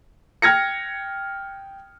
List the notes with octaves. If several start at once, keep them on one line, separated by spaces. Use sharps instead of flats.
G5 F6 G#6 A#6 C#7